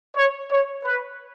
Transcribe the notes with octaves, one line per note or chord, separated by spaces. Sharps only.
C#5
C#5
B4